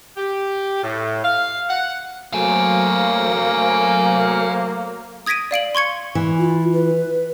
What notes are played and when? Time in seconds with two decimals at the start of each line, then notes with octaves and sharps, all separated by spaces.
0.17 G4
0.83 A2
1.24 F5
1.69 F#5
2.33 F#3 A3 A#3 C5 F5 G#5
5.26 D#6 G#6 A#6 B6 D7 D#7
5.51 D5 F5 D7 F#7
5.75 C6 C#6 G#6 C#7
6.15 E3
6.39 F4
6.74 B4